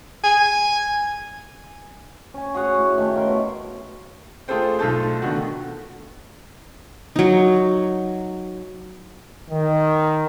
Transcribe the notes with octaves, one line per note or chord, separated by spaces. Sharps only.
G#5
C#4 G#5
F#4 G#4 C#5 F#5
A2
D#3 A3 G4
C#3 A#4 C6
B2 E5
A3 F4 G#4 A4 C5 G5
B1 A3 F4 A4 A5 G6
D3 D#3 A3 B3 F#4
F#3 D#4
D#3